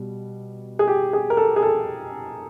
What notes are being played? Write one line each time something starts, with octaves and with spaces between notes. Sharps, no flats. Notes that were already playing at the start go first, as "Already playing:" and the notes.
Already playing: B2 G3
G#4
G4
G#4
A#4
A4
G#4
A4